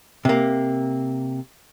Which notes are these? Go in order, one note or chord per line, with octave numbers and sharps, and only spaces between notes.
C3 A#3